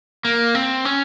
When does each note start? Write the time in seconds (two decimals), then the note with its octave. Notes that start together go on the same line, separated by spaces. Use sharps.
0.25 A#3
0.55 C4
0.85 C#4